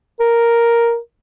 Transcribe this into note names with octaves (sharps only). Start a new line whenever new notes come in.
A#4